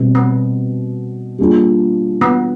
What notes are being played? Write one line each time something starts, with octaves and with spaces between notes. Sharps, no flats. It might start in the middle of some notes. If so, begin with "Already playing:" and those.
Already playing: B2 G3 C4
B3
G3 A#3 D4 F4 G#4
B3